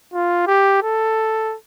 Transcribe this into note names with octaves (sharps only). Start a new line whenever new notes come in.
F4
G4
A4